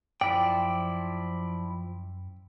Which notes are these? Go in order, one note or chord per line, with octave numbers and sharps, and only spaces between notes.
F#2 F3 E4 D5 G5